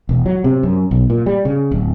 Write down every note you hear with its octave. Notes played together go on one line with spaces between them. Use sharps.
E1
F#3
C3
F#2
B1
A#2
G3
C#3
D1